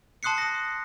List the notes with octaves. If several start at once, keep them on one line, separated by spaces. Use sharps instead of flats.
A5 C6 D#6 F#6 C7 C#7
D#6 A#6